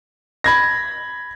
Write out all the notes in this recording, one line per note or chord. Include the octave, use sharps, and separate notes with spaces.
B5 G#6 A#6